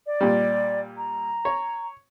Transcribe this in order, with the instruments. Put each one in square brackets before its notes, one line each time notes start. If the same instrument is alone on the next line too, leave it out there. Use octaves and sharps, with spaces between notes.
[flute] D5
[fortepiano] A#2 G3
[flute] A#5
[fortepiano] C#5